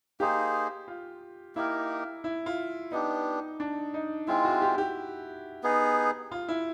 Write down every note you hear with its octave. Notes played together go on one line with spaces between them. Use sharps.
A#3 D#4 G4 G#4 C5
F4
A#3 D#4 E4 G4 A#4
E4
F4
B3 D4 D#4 G4
D4
D#4
G#3 C4 E4 F4
F#4
G4
G4
B3 D#4 G#4
F4
E4